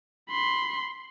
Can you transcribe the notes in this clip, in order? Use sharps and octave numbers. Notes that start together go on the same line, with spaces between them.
B5 C6